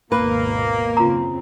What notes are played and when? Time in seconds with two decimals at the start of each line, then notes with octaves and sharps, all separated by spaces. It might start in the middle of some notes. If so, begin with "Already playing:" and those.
0.12 G#1 D#2 B2 A#3 B4
0.97 F#2 C#3 C4 F4 A#5